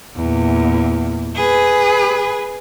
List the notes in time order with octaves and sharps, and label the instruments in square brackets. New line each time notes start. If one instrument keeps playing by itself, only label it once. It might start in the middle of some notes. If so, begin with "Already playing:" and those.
[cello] E2 A#2
G#4 B4